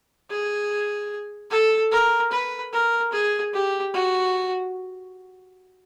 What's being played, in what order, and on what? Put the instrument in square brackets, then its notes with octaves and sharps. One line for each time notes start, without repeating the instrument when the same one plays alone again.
[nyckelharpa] G#4
A4
A#4
B4
A#4
G#4
G4
F#4